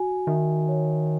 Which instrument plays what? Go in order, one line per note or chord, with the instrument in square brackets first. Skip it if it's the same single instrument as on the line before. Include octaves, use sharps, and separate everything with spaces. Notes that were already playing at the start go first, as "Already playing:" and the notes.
Already playing: [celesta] F#4 G#5
[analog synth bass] D#3 [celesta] E5
[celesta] C#5